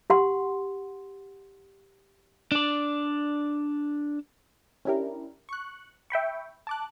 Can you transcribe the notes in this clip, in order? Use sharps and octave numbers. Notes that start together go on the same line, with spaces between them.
G4 F#5 C6
D4 D5
C#4 D4 E4 G4 A#4
C#6 F#6
E5 G5 B5 C#6
A5 D6 F#6